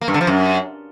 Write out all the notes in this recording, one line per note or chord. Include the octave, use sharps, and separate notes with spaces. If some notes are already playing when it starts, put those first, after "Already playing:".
A#3
G2
D3
F3
F#2